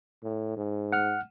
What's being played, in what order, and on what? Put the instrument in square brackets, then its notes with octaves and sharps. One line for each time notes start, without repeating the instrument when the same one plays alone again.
[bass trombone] A2
G#2
[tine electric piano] F#5 F6